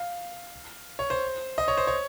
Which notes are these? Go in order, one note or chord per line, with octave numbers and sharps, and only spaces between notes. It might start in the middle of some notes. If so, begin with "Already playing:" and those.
Already playing: F5
C#5
C5
D#5
C#5
C5
C#5